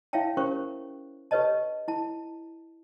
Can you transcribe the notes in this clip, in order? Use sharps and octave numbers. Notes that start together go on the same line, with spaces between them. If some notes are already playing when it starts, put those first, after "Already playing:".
E4 C#5 E5 F5 G5 A5
C#4 G4 A#4 C5 C#5 C#6
G4 A4 B4 C#5 D#5 A5
E4 A5